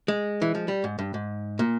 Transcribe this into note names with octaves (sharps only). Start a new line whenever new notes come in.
G#3
E3
F3
G3
G#2
G2
G#2
A#2